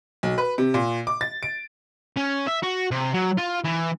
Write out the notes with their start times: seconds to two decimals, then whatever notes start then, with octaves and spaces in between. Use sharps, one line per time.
0.23 B1
0.38 B4
0.58 C3
0.74 A#2
1.07 D6
1.21 A6
1.43 D7
2.16 C#4
2.47 E5
2.63 F#4
2.91 C3
3.14 F#3
3.38 F4
3.64 E3